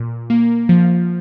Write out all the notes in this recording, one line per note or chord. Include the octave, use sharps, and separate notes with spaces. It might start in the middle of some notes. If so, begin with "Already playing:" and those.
Already playing: A#2
A#3
F3